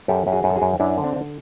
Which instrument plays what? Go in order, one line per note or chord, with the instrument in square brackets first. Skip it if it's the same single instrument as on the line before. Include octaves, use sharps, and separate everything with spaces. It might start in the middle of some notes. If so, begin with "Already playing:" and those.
[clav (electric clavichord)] F#2 G4 A4
F#2 G4
F#4 G#4
F#2
A4
F#4 G#4
F#2
F#2 D4 E4
D3
C4 D4
D3